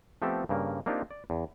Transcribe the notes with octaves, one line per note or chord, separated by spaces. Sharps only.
F3 A3 B3 C4 G4 A4
G2 C#3 A#3
A#3 C4 D4 D#4 F4 G4
D5
E2